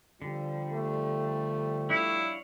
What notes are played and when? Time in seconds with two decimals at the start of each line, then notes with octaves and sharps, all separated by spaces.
0.22 D3 F3 G3
0.73 A3
1.90 D4 E4 C#5 F5